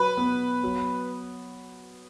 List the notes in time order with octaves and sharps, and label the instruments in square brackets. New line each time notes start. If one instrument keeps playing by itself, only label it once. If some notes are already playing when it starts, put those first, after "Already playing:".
Already playing: [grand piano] F#3 [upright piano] B4
[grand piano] B3
F#3